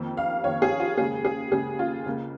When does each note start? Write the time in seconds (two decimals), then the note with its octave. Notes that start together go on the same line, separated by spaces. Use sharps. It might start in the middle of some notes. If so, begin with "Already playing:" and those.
Already playing: F2 D#3 A#3
0.17 F5
0.44 F2 D#3 A#3 C#5
0.62 G#4
0.80 F4
0.98 D#2 C#3 G#3 G#4
1.25 G#4
1.52 D#2 C#3 G#3 G#4
1.79 F4
2.06 C#2 C#3 A#3